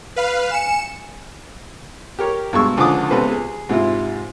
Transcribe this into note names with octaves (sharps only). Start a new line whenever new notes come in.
B4 F5
G#5 C#7 E7
G4 A#4 C#5
G2 B2 G#3 C#6 E6
C#2 D3 F3 D4 D6 D#6
C#2 C3 B3 A4 B4 C5
G#4
G#2 C3 E4 F4